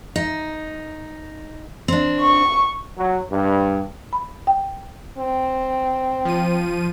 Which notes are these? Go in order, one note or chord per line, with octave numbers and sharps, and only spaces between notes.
D#4
C4 D4
C#6
F#3
G2
B5
G5
C4
F3 D#7